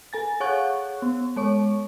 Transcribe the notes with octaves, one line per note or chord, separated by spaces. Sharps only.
A4 G#5 A6
G#4 C#5 F5 F#5 C#6 F#6
B3
G#3 C#5 C#6